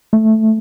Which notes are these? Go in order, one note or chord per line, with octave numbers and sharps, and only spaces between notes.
A3